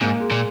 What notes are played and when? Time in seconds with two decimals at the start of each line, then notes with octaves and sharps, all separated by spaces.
0.01 G#2 A#3
0.20 G#3
0.31 A#2